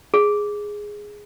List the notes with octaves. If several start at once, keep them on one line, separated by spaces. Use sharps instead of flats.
G#4